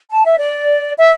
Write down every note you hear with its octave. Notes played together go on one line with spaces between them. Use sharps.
A5
E5
D5
E5